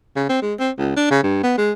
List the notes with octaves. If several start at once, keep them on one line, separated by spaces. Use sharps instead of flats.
C#3
C4
G#3
C4
C#2
D4
C#3
G2
B3
G#3